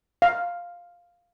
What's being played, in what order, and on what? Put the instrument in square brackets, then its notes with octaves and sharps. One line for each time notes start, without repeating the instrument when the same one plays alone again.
[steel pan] F5